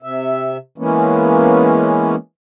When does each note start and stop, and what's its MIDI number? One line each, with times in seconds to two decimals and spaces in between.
0.03 0.57 48
0.03 0.57 76
0.78 2.15 52
0.78 2.15 56
0.78 2.15 58
0.78 2.15 59
0.78 2.15 61